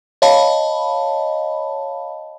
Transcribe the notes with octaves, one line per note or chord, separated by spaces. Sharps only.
C#5 D#5 F5 A5 B5